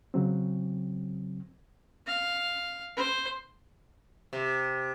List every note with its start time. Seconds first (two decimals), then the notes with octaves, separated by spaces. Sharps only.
0.14 C#3 F#3 C4
2.06 F5
2.96 C5
4.33 C3